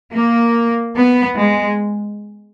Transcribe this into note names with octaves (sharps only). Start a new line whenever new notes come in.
A#3
B3
G#3